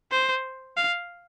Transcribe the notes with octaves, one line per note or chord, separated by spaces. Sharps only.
C5
F5